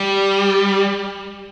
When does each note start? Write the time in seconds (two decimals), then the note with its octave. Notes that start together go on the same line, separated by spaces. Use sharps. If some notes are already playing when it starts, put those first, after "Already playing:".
Already playing: G3